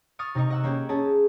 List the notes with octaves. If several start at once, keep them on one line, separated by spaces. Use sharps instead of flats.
C#6 D#6 F6 A6
C3 D#4 D#5 C#6
D#5 F#5 E6
A#3 C#4 G4
C#4 G#4 A5